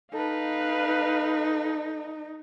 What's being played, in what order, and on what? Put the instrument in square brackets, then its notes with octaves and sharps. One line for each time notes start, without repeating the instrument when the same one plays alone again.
[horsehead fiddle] D#4 [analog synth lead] A4 [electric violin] B4 F5